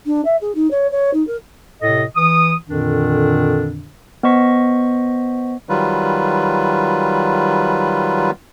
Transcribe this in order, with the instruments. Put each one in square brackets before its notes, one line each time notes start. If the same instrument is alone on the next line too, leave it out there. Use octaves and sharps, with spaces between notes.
[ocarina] D4
E5
G#4
D#4
C#5
C#5
D#4
A#4
[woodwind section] A2 C3 A4 D#5
E3 D#6
F2 A#2 D3 D#3 D4
[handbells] B3 C5 D#5 C#6 B6
[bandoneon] D#3 F#3 G3 F4 B4